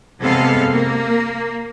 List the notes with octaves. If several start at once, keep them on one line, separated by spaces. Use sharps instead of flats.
C3 G#3 B3 A4 F5
A#3